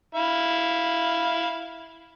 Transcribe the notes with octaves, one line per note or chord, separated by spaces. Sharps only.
E4 F5